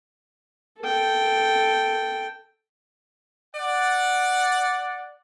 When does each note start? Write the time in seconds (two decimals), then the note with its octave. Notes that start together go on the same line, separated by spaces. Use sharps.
0.81 A4 G5
3.56 D5 F#5